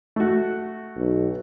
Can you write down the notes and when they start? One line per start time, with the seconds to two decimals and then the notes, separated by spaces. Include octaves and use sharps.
0.16 A3 F#4
0.96 B1